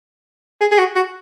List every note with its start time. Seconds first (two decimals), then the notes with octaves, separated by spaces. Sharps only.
0.61 G#4
0.71 G#4
0.79 F#4
0.96 F#4